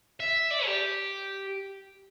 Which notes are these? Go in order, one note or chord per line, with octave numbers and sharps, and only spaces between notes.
E5
D5
G4